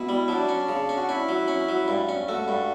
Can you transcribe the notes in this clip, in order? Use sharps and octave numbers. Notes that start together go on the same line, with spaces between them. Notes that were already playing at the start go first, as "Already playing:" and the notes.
Already playing: B2 E4
G3
F#3 D4
C#4
C#3
C#4
F#4
C#4 E4
F#3
C#4
F#3
G2
C#4
A3 F#4
G2